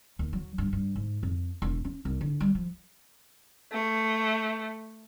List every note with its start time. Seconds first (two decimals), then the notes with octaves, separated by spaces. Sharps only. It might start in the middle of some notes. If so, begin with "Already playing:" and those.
0.19 D#2
0.33 F#3
0.58 G2
0.73 G2
0.95 G#2
1.23 F2
1.62 E1
1.85 C#4
2.05 C2
2.21 D3
2.40 G3
2.55 F3
3.73 A3